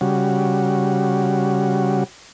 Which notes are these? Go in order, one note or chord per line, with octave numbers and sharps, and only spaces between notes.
C#3 G3 F#4